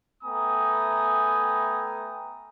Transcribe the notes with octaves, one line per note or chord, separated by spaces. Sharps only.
A3 B3 G5 G#5 A#5 D#6